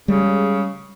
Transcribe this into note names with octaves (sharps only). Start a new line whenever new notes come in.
C#3 G3 G#3